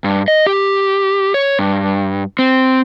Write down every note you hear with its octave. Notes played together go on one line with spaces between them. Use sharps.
G2
D#5
G4
C#5
G2
C4